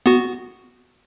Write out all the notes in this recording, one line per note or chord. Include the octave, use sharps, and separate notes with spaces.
B3 F#4